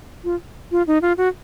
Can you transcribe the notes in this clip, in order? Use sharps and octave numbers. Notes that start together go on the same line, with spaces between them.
F4
F4
D#4
F4
F#4